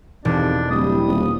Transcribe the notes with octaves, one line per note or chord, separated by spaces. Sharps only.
E1 F2 C3 D#3 D4
D1 G3 E4 D#6
D#1